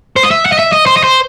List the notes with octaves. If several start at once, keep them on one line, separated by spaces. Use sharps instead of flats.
C5
D#5
E5
F#5
D#5
E5
D#5
C5
D#5
C5